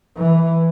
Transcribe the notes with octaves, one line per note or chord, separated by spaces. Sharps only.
E3